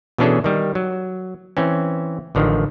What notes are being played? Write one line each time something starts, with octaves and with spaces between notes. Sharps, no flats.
B2 E3 C#4 D4 G#4 A4
D#3 G3
F#3
E3 C4 C#4
A1 D3 D#3 F3